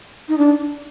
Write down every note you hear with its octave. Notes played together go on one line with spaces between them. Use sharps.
D#4
D4